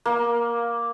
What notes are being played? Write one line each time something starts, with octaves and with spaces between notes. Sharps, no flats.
A#3